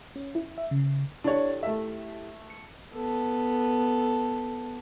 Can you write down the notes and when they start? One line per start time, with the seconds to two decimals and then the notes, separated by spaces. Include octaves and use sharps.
0.16 C#4
0.35 E4
0.58 E5
0.71 C#3
1.24 D4 E4 G4 A4 C#5
1.63 A3 E5
2.50 C#7
2.94 B3 A4